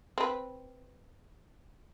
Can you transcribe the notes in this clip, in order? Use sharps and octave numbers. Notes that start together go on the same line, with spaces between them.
C4 B4